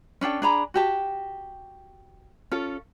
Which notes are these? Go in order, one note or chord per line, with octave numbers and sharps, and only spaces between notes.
C#4 D4 A4 G5
D4 G#4 A#5 B5
F#4 G4 A5
C#4 F4 A4